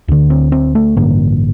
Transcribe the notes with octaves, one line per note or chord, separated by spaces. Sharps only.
D2 D3
C4
C4
A3
A1 G2 D3 A#3